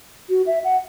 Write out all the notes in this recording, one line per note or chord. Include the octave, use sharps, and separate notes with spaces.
F#4
E5
F#5